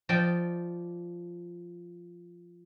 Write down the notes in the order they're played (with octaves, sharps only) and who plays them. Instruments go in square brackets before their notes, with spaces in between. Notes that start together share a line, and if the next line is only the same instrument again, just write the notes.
[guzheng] F3 D5 D#5 G5